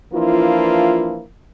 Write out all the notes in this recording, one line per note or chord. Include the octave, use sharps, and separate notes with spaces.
E3 F3 A#3 D4 E4 F4